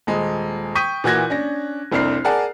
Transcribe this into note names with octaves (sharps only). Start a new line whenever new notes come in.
D#1 G#3
G5 C#6 D#6 G6 B6 D#7
A#2 E3 F#4 F#6 G#6 A#6
C#4 D4 A#6
F1 C2 C4 D4 F6 C7
G#4 A#4 D5 F#5 A5